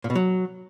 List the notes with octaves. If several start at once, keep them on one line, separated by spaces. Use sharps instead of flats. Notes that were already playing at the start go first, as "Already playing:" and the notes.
A#2
B2
F#3